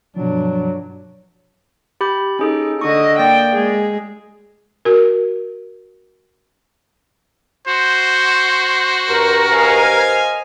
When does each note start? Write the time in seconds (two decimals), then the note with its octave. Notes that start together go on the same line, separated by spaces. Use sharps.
0.16 G2 B2 F3 F#3 D4
2.01 G4 B5 G6
2.39 C#4 D#4 G#4 A4
2.81 D3 D#5 C#6 D#6
3.19 A#3 D5 G5 A#6
3.54 G#3 G#4
4.85 F#4 A#4
7.68 F#4 C5
9.09 G2 A#4
9.51 C5 D#5 F5 G#5